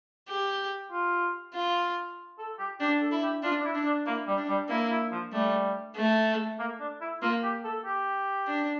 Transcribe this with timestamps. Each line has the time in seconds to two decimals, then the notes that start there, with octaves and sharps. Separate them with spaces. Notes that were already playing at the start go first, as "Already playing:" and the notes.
0.28 G4
0.91 F4
1.54 F4
2.38 A4
2.59 G4
2.80 D4 G4
3.01 A4
3.12 E4
3.22 G4
3.43 D4 F4
3.60 D4
3.64 E4
3.75 D4
3.85 D4
4.06 A#3 E4
4.27 G3
4.38 D4
4.48 G3
4.69 A#3 E4
4.90 E4
5.11 F3
5.32 G3 A3
5.96 A3
6.59 A#3
6.80 D4
7.00 E4
7.22 A#3 F4
7.43 G4
7.64 A4
7.85 G4
8.48 D4